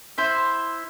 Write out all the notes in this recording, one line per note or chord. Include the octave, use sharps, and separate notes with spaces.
E4 C5 E5